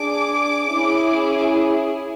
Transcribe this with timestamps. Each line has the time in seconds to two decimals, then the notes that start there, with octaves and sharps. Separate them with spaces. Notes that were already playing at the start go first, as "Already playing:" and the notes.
Already playing: D4 G#4 D6
0.73 C#4 E4 G#4